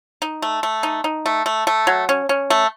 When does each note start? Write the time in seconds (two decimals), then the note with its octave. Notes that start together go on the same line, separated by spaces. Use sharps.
0.22 D#4
0.42 A3
0.63 A3
0.83 D#4
1.04 D#4
1.26 A3
1.46 A3
1.67 A3
1.87 F#3
2.09 C#4
2.29 C#4
2.50 A3